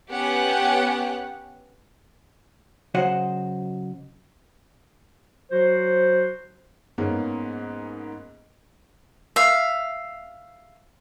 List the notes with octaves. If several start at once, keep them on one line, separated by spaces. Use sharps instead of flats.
B3 C#4 G4 F#5
C#3 F#3 F#4 C5 D#5 F#5
F#3 F#4 C5
G#2 A#3 B3 C#4
E5 F5